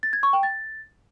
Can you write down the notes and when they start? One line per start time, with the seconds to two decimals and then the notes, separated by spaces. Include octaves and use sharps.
0.03 A6
0.13 G#6
0.23 C#6
0.33 G5
0.43 A6